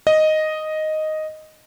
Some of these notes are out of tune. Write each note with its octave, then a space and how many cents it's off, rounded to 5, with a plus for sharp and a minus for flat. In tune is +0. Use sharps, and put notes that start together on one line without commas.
D#5 +0